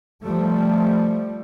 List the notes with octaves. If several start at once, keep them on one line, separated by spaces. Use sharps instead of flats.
F3 G3 A3